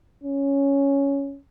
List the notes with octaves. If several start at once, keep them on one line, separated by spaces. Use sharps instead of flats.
C#4